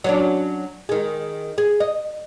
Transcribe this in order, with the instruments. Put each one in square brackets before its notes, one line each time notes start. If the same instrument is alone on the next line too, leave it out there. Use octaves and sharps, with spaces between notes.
[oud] F#3 C#4 D4
D#3 G#3
G#4
D#5